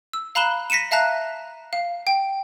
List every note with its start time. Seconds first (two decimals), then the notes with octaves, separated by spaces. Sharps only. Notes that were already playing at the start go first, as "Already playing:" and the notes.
0.13 E6
0.35 F5 A#5 B5 F#6 E7 G7
0.70 A#6 B6 C#7 D#7 E7
0.91 E5 F5 A5 A#5 F#6 A#6
1.73 F5
2.07 G5